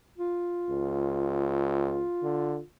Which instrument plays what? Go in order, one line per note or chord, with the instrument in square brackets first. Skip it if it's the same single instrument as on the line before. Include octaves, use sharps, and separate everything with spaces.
[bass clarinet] F4
[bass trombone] C#2
D3